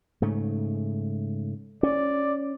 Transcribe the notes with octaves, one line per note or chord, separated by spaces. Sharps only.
G#2 C#3 A3
C#4 D5